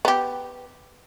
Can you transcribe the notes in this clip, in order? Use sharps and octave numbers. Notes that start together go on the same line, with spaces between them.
B3 G4